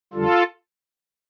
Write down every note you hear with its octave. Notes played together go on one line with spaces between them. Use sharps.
F2 D3 G3 F4 A4